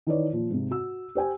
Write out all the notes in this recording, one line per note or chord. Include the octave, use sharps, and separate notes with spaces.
D#3 E3 D#4 B4 C#5 D5
A#2 F3
G#2 C3
F#4 E6
G4 C5 G5 G#5